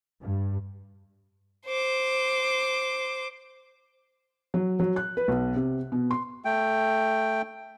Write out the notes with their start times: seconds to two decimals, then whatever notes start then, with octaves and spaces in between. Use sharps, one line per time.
0.20 G2
1.66 C5 D6
4.54 F#3
4.80 F#3
4.96 F#6
5.17 B4
5.28 B1
5.55 C3
5.92 B2
6.11 C6
6.45 A3 G5